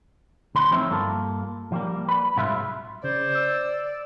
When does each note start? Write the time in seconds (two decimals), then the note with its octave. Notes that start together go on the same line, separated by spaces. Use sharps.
0.55 D2 B4 C6
0.71 F3 A3 C4 C#4 D#4 E4
0.90 G2 A#3 F4 A4
1.72 F3 G3 A#3
2.08 B4
2.36 C2 G#2 F#3 F4 B4 E5
3.04 C#3 C5 D5
3.35 E6